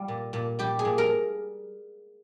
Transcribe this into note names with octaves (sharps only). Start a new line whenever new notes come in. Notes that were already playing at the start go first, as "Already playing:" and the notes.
Already playing: G3 F4
A#2
A#2
G3 G4
G#4
A#2
A#4